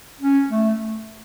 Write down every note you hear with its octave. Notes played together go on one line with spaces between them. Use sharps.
C#4
A3